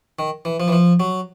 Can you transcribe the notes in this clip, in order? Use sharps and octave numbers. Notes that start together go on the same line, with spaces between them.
D#3
E3
F3
E3
F3
F#3